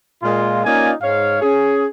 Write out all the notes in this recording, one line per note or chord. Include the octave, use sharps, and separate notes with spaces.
A#2 G#3 F4
A#3 C#4 D#4 F4 D5 G#5
G#2 C#5 F5
C#4 G#4